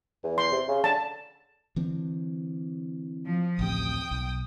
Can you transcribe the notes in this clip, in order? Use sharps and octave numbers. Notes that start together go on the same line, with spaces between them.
E2
C6
C3
C#3
D3 A5
D3 E3 C4
F3
A1 D2 C3 G5 D#6
B1